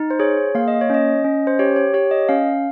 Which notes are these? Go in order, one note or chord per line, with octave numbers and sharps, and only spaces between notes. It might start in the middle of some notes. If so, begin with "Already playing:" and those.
Already playing: D#4
C5
G#4 C#5
A#3 F5
D#5
C#5
C#4 D#5
C#4
C5
G4 C#5
C#5
G4 C#5
D#5
C#4 F5